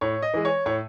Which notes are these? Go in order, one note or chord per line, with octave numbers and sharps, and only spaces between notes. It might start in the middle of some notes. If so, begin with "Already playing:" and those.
A2 C#5
D#5
E3 G#3
C#5
A2 C#5